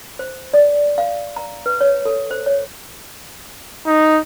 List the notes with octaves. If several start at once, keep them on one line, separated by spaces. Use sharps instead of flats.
C5
D5
F5
A#5
B4
C#5
A4
C5
C#5
D#4